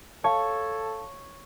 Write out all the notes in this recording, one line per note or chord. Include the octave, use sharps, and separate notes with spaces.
A4 C#5 F5 A5